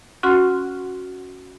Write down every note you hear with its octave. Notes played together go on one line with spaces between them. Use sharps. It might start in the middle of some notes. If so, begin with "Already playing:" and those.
C#4 F#4 F#5 C6 F6